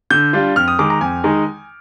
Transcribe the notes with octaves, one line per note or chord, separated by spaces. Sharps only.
D3 G6
G3 D4 F4
F2 F6
D#6
D#3 G#3 D6
A#5
F2 G#5
D#3 G#3 D#4